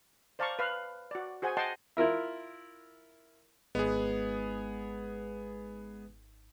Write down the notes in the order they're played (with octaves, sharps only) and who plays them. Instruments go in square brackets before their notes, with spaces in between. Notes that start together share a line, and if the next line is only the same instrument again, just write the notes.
[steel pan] C5 D5 F5 A5 A#5 C#6
B4 F5
F#4 D5
F#4 G#4 C5 F#5 G#5
D#5 F#5 G5 A5 C6
[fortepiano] E4 F4 A#4 E5
[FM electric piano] G#1 [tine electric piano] G#3 B4 [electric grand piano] B3 G#4